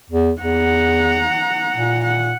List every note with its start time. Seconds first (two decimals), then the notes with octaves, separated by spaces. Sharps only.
0.10 E2
0.41 E2 F#5 A#5
1.76 A#2
2.05 F#5